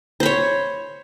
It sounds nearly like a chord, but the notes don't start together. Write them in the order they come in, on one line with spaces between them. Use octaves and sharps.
C5 B5 C#5